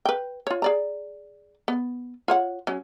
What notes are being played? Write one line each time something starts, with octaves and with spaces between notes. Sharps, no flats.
B4 G5
F4 C#5
G#4 D5 A#5
B3
F4 C#5 F#5
F#3 C#4